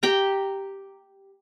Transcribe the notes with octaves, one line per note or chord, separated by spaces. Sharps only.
G4 G5 A#5